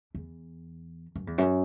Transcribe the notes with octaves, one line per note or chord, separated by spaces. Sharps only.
E2
F#2
E2
F#2